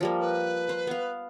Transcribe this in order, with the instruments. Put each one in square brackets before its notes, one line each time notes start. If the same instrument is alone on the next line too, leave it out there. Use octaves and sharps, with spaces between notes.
[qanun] F3 G3 A#3
[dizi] B4
[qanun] C5
B3 F5